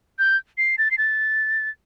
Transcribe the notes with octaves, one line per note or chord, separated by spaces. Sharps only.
G6
C7
A6
C7
A6